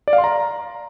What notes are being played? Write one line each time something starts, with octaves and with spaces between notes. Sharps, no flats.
D5
F5
C6
A#5